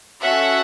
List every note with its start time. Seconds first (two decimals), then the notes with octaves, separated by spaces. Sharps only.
0.22 C#4 F#4 A4 E5 F#5